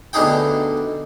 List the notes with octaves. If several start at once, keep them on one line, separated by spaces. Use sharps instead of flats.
D2 B2 D4 D#4 G#4 G5